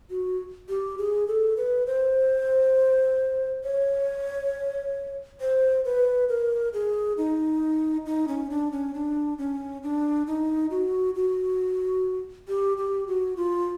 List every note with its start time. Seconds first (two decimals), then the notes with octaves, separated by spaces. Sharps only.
0.10 F#4
0.69 G4
0.98 G#4
1.28 A4
1.57 B4
1.87 C5
3.64 C#5
5.41 C5
5.85 B4
6.29 A#4
6.73 G#4
7.18 D#4
8.06 D#4
8.28 C#4
8.50 D4
8.72 C#4
8.94 D4
9.38 C#4
9.83 D4
10.27 D#4
10.71 F#4
11.15 F#4
12.48 G4
12.78 G4
13.07 F#4
13.37 F4